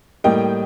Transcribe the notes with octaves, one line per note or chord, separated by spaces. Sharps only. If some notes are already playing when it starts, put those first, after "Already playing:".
A2 G3 A#3 D#5 G5